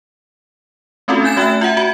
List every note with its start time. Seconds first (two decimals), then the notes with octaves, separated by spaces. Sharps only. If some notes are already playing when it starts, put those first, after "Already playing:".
1.08 A3 C4 C#4 F4 F#4 A4
1.23 C#4 E4 G#5 G6 A6 E7
1.37 A3 F#4 E5 G5 F#6 E7
1.61 F4 E5 F#5 A#5
1.77 F#4 B5